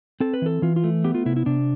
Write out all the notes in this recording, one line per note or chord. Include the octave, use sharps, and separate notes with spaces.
C4 A4
B4
E3 A4
E3 F4
F4
A3
B3 G4
F4
C3 E4
E4
C3 D4